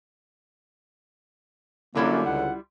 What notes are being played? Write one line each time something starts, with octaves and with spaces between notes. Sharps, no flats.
F#2 D3 G3 A#3 E4 F4
C#2 F#5